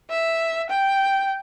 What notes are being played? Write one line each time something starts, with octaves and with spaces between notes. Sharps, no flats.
E5
G5